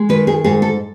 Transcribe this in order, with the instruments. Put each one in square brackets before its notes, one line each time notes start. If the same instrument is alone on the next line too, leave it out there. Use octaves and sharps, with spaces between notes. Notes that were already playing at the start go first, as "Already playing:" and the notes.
Already playing: [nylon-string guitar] G#3
D#3 B4
G#4
G#2 G#4
A4